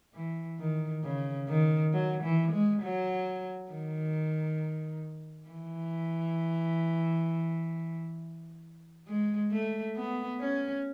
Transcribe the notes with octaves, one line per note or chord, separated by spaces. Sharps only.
E3
D#3
C#3
D#3
F#3
E3
G#3
F#3
D#3
E3
G#3
A3
B3
C#4